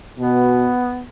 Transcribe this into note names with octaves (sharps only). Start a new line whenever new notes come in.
B2 B3